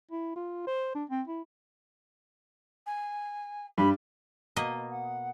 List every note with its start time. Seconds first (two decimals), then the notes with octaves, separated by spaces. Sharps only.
0.11 E4
0.36 F4
0.67 C5
0.95 D4
1.10 C4
1.28 E4
2.86 G#5
3.78 G2 B5
4.56 B2 A#3 D#5
4.91 F#5